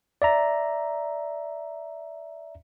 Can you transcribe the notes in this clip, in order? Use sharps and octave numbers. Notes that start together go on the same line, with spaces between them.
D5 E5 A#5